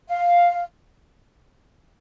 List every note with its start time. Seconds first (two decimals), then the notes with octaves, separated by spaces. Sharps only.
0.09 F5